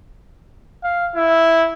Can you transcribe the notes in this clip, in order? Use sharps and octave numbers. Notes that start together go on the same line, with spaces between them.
F5
E4